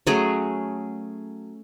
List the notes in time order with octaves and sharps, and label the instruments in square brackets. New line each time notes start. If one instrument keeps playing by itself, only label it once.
[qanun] F#3 A3 C#4 G#4